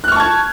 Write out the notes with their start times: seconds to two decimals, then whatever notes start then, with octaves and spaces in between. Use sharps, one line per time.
0.04 F#6
0.08 F6
0.12 C#6
0.16 A5
0.20 G#6